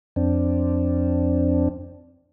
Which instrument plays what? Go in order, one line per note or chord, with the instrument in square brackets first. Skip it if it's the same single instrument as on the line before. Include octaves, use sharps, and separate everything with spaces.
[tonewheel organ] F2 C4 D4